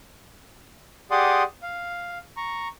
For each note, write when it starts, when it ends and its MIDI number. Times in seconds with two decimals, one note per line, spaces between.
1.11 1.43 67
1.11 1.43 68
1.11 1.43 74
1.11 1.43 78
1.11 1.43 84
1.11 1.43 87
1.63 2.18 77
2.37 2.68 82
2.37 2.68 85